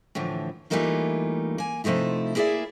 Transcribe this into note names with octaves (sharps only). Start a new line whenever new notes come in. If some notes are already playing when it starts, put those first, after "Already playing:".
A2 D3 E3 F3
E3 G3 A3 A#3 D#4 F4
A#3 G#5
C3 F3 A3 D#4 E4
A#3 E4 G#4 A#4 D5 E5